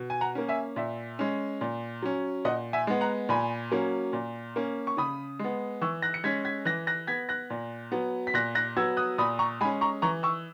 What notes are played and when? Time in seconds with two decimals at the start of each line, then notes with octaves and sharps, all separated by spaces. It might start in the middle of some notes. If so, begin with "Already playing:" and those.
Already playing: B2
0.10 G#5
0.21 F#5 A#5
0.35 A#3 C#4
0.48 E5 G#5
0.76 A#2 E5
1.19 G#3 C#4
1.61 A#2
2.02 F#3 C#4
2.45 A#2 D#5 F#5
2.73 E5 G#5
2.87 G#3 B3
3.01 F#5 A#5
3.29 A#2 G#5 B5
3.71 F#3 A#3 C#4
4.13 A#2
4.56 A#3 C#4
4.87 C#6
4.97 C#3 B5 D#6
5.39 G#3 B3
5.81 E3 C#6 E6
6.02 F#6 A#6
6.14 C#7
6.24 G#3 C#4 G#6 B6
6.45 G#6 B6
6.65 E3 F#6 A#6
6.87 F#6 A#6
7.07 B3 G#6 B6
7.29 F#6 A#6
7.50 A#2
7.92 F#3 B3
8.27 B6
8.34 A#2 F#6 A#6
8.55 F#6 A#6
8.77 F#3 B3 E6 G#6
8.97 D#6 F#6
9.18 A#2 B5 D#6
9.39 A#5 C#6
9.61 G#3 G#5 B5
9.65 C#4
9.81 A#5 C#6
10.02 E3 A#5 C#6
10.23 C#6 E6